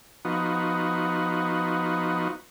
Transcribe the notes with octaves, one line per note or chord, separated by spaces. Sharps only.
F3 B3 D#4 F#4